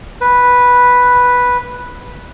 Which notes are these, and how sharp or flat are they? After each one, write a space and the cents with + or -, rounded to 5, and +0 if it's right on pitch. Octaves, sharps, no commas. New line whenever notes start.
B4 -5